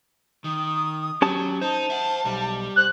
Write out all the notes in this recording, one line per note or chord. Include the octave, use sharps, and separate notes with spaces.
D#3 D#6
F#3 C#4 G4 A5
D#4 C5 A5
E5 F#5
B1 G3
C5 F#6